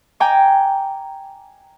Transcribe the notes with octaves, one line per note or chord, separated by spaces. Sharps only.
G5 G#5 A#5 D6